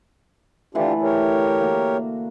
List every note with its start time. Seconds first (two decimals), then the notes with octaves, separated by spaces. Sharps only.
0.75 D3 E3 A3 D4 F4 G4
1.02 G4 A#4 C#5
1.61 A#3 F#4